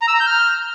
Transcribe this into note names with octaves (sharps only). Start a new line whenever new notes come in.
A#5
E6
A#5
G6
F6